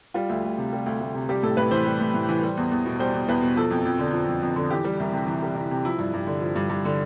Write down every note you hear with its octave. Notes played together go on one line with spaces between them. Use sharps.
G3 F4
D2
D2
C3
G3
D2
D2
C3
G3 G4
A2 A4
A2 B4
E3 C5
G3
A2
A2
E3
G3
E2
E2
B2
G3 C5
E2
E2 B4
B2
F3 A4
F2
F2
D3
F3
F2
F2
D3
E3 G4
G3
C2
C3
E3
G3
C2
C3
F3 E4
G2
G2
D3
F3
G2
G2
D3